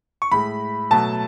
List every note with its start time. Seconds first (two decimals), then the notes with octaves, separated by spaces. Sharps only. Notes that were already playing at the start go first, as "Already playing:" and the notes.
0.22 C#6
0.31 A2 G#3 B5
0.91 B2 F#3 A3 A5